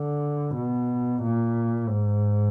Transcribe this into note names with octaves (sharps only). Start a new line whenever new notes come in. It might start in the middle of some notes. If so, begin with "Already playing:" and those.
Already playing: D3
B2
A#2
G#2